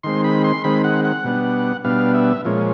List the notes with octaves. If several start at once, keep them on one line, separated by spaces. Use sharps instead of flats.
D#3 G#3 C4 C6
B5
C6
D#3 G#3 C4 B5
F#5
F#5
B2 G3 B3 D4
B2 G3 B3 D4 F5
E5
A#2 F3 G#3 C#4